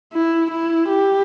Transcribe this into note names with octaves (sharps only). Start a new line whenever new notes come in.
E4
E4
G4